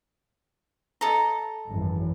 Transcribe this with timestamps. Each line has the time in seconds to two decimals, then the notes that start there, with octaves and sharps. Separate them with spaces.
1.01 A4 D#5 A#5
1.67 G#1 F#2 E3